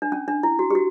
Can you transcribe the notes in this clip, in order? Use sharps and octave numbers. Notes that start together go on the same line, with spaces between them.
D4
C#4
D4
E4
F#4
G4
F#4